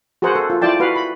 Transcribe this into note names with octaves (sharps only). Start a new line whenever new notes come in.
F#4 G#4 A#4 C5 F#5
A4
F4
E4 F4 D5 G5 A5
F#4 B4 F5
B5